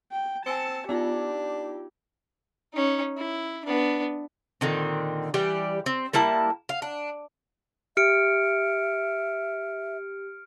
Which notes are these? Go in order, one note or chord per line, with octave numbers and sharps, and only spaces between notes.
G5
C4 G#5 A5 E6 C#7
B3 D4 D#4 F4 G4
C#4 D#4
E4
B3 D4
A#2 D3 D#3 C4
E3 G3 G4 D5
C4
G3 A#3 E4 A5
F5
D4
G4 E5 F6 C#7 D7